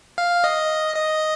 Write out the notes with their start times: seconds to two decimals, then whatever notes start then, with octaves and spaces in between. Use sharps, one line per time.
0.18 F5
0.44 D#5
0.96 D#5